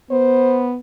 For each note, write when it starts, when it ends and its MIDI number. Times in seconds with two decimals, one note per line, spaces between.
0.11 0.77 59
0.11 0.70 72